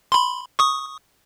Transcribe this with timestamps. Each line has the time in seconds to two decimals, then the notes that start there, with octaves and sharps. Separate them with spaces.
0.12 B5 C6
0.59 C#6 D#6